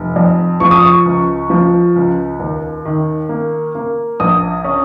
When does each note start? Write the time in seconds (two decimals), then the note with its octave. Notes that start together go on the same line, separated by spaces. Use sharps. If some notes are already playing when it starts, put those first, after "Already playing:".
Already playing: F1
0.16 F2
0.60 F3 C#6
0.71 D#6
0.82 C#6
1.06 C#2
1.50 F3
1.96 C#2
2.40 D#2
2.85 D#3
3.29 A#3
3.75 A#3
4.20 A#1 D#6
4.64 C#4